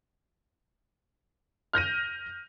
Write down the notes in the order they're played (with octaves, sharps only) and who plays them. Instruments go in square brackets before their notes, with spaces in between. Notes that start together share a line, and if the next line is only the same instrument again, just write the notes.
[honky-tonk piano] F6 G6 A#6 D#7